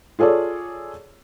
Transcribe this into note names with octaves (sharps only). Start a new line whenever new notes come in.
F4 G#4 A4 C#5 D5